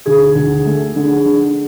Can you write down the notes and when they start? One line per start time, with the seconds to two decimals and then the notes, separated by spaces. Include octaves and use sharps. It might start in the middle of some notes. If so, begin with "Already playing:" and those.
0.06 D2 G#4
0.35 D2
0.65 A3
0.96 D3
1.25 D3